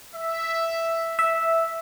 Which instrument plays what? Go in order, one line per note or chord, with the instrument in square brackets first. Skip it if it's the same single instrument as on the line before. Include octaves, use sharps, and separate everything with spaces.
[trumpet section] E5
[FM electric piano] E5